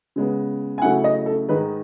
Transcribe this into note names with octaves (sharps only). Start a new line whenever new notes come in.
C#3 G#3 B3
G#5
C#3 F#3 A3 C#4 E4 F#5
D#5
A4
G#2 D#3 G#3 D#4 B4